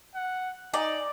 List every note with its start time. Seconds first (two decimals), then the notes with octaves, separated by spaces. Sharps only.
0.15 F#5
0.74 D#4 D5 D#5 G#5 A#5